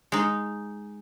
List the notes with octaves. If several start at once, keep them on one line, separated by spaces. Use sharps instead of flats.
G#3 D#4